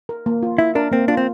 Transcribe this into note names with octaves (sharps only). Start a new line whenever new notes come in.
A#4
A#3
F4
E4 E5
D4 A#4
A#3 C4
D4 F4
C4